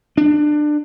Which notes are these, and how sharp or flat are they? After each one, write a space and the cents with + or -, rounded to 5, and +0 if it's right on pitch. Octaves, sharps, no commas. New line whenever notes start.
D4 +25